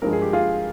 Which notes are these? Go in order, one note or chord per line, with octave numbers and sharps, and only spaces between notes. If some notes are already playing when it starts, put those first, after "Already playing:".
G2 F3 G#3 A#4
G#4
G4
F4 G#4